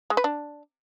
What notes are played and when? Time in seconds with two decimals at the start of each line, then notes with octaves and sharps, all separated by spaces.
0.10 G#3
0.17 B4
0.24 D4